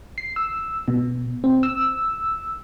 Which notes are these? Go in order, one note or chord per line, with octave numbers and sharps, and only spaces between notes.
C7
E6
B2
C4
E6